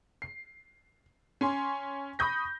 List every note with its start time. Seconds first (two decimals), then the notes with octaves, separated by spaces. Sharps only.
0.22 C7
1.41 C#4 G#5 C6
2.19 B5 C#6 D#6 G6 A#6